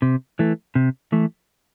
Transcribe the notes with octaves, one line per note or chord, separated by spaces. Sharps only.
C3
E3 A3
C3
E3 A3